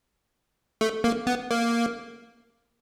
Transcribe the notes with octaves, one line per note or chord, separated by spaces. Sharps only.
A3
A#3
B3
A#3